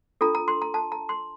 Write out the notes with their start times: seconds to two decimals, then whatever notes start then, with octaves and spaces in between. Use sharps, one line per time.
0.21 D4 F4 A4 A#5
0.35 A#5
0.48 C6
0.62 A#5
0.74 A5
0.92 A#5
1.09 C6